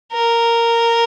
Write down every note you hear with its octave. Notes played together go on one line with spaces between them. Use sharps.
A#4